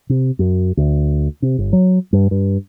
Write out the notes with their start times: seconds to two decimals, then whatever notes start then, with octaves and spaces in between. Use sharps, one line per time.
0.09 C3
0.39 F#2
0.77 D2
1.42 C3
1.58 G1
1.73 F#3
2.13 G2
2.31 G2